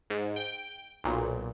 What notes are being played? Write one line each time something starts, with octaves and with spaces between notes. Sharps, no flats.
G#2
G5 G6
B1 A#2